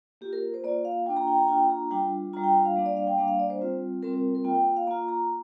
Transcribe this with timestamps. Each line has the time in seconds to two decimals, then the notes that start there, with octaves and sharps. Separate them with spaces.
0.21 A#3 G4
0.25 F4
0.33 A#4
0.54 C5
0.64 A#3 D5
0.68 F4
0.85 F5
1.06 A#3 D4 F4 G5
1.17 A#5
1.27 G5
1.38 A#5
1.48 A#3 D4 F4 G5
1.70 A#5
1.91 G3 D4 F4 G5
2.33 G3 D4 F4 A#5
2.44 G5
2.65 F5
2.76 G3 A#3 D4 F5
2.86 D5
2.97 F5
3.07 G5
3.18 G3 A#3 D4 F5
3.28 F5
3.39 D5
3.50 C5
3.60 G3 C4 F4
4.03 G3 C4 F4 A#4
4.14 A#4
4.35 A#4
4.45 A#3 F4 G5
4.55 G5
4.77 F5
4.87 A#3 F4 A#5
5.08 A#5